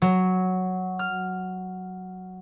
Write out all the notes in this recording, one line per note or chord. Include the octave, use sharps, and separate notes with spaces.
F#3
F6